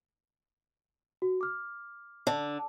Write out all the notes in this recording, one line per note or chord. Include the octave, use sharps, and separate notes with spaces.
F#4
D6 F6
D3